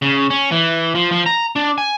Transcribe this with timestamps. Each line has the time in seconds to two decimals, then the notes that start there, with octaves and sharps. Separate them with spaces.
0.02 C#3
0.30 C#4
0.52 E3
0.95 F3
1.12 F3
1.26 A#5
1.56 D4
1.78 G#5